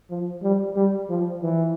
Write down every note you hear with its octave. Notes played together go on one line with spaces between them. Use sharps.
F3
G3
G3
F3
E3